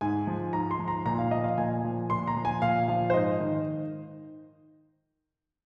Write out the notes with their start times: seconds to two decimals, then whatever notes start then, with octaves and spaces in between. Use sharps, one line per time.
0.01 G#2 G#5
0.27 F3
0.53 G#2 A#5
0.71 C6
0.79 F3
0.88 A#5
1.05 A#2 A#5
1.18 F5
1.31 F3 D#5
1.44 F5
1.58 A#2 G#5
1.84 F3
2.10 A#2 C6
2.28 A#5
2.36 F3
2.45 G#5
2.62 A#2 F5
2.88 F3 F5
3.10 C5
3.14 G#2 D#5
3.40 D#3